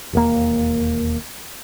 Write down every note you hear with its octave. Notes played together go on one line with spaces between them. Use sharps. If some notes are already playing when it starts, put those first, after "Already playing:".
E1 D#2 A#3